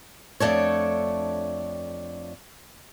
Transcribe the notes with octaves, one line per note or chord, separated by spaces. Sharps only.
F2 A3 D4 C#5